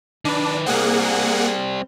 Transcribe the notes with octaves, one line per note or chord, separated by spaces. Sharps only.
D#3 D4 B4
G3 A#3 C4 G#4 F#5